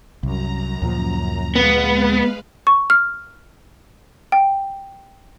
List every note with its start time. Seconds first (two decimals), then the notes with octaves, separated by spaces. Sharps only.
0.23 C2 F#2 A#5
0.82 D2 A#2 F3
1.56 G#3 B3 B4 F5
2.67 C#6
2.90 F6
4.32 G5